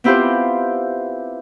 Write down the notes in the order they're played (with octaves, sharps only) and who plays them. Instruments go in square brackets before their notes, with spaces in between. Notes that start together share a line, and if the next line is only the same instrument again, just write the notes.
[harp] B3 C4 E4 F4 G4 C5